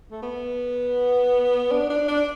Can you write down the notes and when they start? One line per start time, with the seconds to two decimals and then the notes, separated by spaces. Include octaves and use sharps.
0.11 A3
0.22 B3
1.71 D4
1.90 D4
2.08 D4